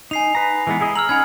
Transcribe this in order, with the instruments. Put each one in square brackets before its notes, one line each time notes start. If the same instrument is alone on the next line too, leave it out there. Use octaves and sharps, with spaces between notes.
[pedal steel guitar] D#4 [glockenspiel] G#5 C7 F7
[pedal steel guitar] B4 A#5
E3 G#3 B3
E4 G#4 D#5
[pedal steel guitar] A#5 E6 [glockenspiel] F6 F#7
[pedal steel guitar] C#4 D#4 F#5 [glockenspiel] G#5 B5 G#6